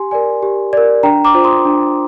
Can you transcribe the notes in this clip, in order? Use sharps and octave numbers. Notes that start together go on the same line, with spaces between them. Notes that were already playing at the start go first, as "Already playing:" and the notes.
Already playing: G4 G#5 C6
A#4 D5 G#5
G4
A#4 D5
D4 G5 A#5
A#5 D6
F4 C5
C6 D#6
D4